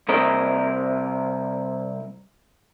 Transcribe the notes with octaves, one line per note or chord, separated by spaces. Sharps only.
C2 C4 A#4 D#5